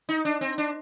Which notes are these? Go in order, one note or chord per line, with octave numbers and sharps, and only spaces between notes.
D#4
D4
C4
D4